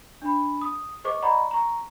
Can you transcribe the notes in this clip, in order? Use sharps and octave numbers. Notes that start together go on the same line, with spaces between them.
D4 B5
D#6
G#4 B4 C5 D#5 C#6 D6
D5 D#5 F#5 A#5 B5 C#6
A#5 C#6